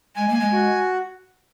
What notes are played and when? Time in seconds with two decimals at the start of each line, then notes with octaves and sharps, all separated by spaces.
0.16 G#3 G#5
0.28 A#3
0.34 G#5
0.40 G#3
0.52 F#4